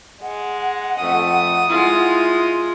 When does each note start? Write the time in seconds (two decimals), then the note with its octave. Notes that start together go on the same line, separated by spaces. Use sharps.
0.23 G#3 F#5
1.02 F2 A3 D#6
1.69 G#3 E4 F4